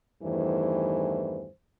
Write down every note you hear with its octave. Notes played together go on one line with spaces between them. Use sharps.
E2 G2 D#3 E3 A3 C5